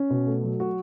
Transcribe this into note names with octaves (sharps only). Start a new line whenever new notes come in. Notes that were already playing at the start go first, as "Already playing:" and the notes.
Already playing: C#4
B2
A3
F#3
F#4